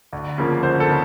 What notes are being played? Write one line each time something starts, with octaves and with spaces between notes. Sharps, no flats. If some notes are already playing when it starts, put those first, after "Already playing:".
D2
C#3 F3 A#3
D2 C5
A4
C#3